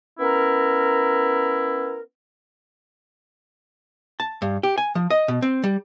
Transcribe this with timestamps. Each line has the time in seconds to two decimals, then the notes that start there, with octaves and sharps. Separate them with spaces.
0.20 B3 C#4 E4 A#4
4.20 A5
4.42 G2
4.63 G4
4.78 G#5
4.95 F3
5.10 D#5
5.28 B2
5.42 C4
5.64 G3